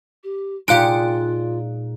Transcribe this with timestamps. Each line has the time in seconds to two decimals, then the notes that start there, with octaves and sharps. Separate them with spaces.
0.24 G4
0.68 A#2 G#3 D#4 F4 G4 F5 F#6 D7